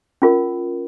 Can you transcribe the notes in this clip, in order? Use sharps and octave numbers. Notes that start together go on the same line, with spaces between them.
C#4 F4 A#4